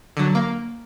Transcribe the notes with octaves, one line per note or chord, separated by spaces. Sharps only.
D3 F#3
A#3